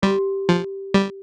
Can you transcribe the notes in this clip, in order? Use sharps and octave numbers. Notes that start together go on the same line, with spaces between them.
G3 G4
F3
G3